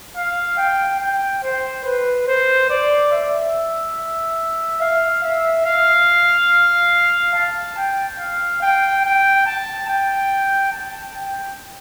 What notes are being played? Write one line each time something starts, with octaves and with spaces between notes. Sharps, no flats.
F5
G5
G5
C5
B4
C5
D5
E5
F5
E5
F5
A5
G5
F5
G5
G5
A5
G5
A5
G5